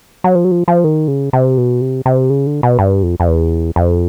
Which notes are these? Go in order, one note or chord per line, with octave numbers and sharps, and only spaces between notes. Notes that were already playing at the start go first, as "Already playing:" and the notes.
F#3
F3
F#3
F3
F3
D#3
C#3
C3
B2
C3
C3
C#3
D3
B2
G2
F2
F2
E2
F2